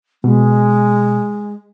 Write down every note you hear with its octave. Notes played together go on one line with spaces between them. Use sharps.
B2 G#3